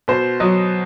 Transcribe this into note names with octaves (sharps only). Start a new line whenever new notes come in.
B2 C5
F#3 D#5